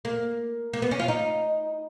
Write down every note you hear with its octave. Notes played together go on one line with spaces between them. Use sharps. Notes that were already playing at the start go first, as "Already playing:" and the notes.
A#3
A#3
B3
C#4
F4
D#4